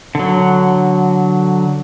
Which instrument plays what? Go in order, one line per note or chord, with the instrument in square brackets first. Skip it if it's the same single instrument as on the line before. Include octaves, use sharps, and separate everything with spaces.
[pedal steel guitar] D3 F#3